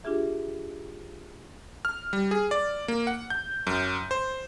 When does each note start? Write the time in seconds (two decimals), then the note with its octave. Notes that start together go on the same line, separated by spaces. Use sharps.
0.04 D4 F4 G4 G#4 E5
1.85 F6
2.13 G3
2.31 G#4
2.51 D5
2.88 A#3
3.07 F#5
3.30 G6
3.67 F#2
4.11 C5